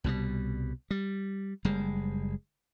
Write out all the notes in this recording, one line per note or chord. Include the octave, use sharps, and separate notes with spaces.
C2 B2 F#3 G3
G3
F#1 G3 G#3